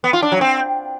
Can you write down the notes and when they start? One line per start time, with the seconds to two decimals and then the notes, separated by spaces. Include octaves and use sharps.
0.04 B3
0.13 F4
0.22 D4
0.32 F#3
0.41 C4